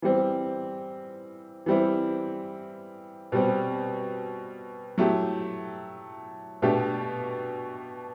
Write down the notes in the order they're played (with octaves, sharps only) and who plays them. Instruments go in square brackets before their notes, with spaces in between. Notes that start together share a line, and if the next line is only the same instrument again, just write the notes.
[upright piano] E3 G3 C4
E3 G3 C4 E4
B2 G3 C4
F#3 A3 E4 G4
B2 A3 D4 G4